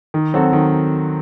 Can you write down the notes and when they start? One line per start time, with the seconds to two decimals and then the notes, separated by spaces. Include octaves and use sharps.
0.14 D#3
0.34 F#3 C4 F#4 A4
0.53 D#3